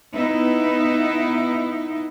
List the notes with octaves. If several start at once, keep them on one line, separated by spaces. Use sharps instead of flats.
B3 D#4 E4